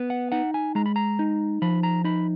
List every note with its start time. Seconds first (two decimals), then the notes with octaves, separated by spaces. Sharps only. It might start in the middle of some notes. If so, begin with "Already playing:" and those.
Already playing: B3
0.10 F#5
0.32 D#4 F#5
0.54 G#5
0.75 G#3 A#5
0.86 B5
0.96 A#5
1.19 D#4
1.62 F3 B5
1.83 A#5
2.04 D#4 B5